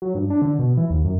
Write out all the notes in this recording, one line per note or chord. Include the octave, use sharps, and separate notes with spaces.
F#3
G2
D4
D3
B2
E3
D#2
F#2